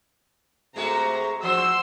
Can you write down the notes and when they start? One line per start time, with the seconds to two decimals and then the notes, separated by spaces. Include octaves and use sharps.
0.76 C3 G#3 A3 F#4 C5 A#5
1.43 F3 F#4 B4 C5 C6 E6